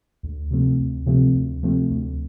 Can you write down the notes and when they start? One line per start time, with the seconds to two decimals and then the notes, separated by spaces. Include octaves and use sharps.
0.23 D2
0.51 C3 F3 A3 C4
0.79 D2
1.06 C3 F3 A3 C4
1.35 D2
1.63 C3 F3 A3 C4
1.90 D2